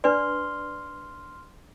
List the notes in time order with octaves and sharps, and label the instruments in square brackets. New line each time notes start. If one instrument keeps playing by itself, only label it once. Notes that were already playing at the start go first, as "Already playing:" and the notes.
[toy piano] D4 B4 D5 [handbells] C6 F6